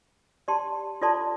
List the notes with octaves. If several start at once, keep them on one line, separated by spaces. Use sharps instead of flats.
G4 D5 A5 C6
F4 A4 D5 A5 C6